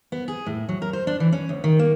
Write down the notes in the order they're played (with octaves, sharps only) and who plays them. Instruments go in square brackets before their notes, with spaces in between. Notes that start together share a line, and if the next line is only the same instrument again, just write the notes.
[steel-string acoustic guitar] B3
G#4
A2
F#3
A#4
C5
D4
E3
C#4
D2
D#3
A#3